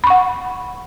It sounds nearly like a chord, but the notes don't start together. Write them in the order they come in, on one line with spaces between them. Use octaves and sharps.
B5 C#6 F#5